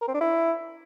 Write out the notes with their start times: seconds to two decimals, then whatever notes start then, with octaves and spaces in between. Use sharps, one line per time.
0.01 A#4
0.08 C4
0.14 D4
0.21 E4